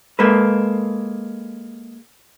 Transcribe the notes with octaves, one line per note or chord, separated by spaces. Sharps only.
G#3 A#3 A4 B4